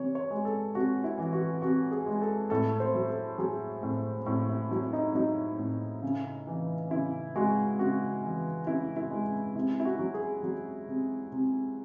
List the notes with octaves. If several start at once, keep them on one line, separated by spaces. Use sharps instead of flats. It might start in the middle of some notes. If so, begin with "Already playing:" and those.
Already playing: C3 E3 C#5
C#5
G#3
A4
C3 F#4
E4
E3
F#4
C3 F#4
G#4
G#3
A4
A2 A4
C5
F#3
A4
F#3 G#4
A2
A2
E4
F#3 E4
D#4
F#3 D#4
A2
C#3
E3
C#3 E4
G#3 F#4
C#3 F#4
E3
C#3 E4
E4
G#3
C3 E4
E4
F#4
F#3
G#4
F#3
C3
C3